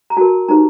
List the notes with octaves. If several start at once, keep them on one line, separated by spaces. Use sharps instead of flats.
A#5
F#4 A#4 A5
D#4 G4 C5 A#5